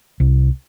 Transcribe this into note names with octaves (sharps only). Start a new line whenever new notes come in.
C2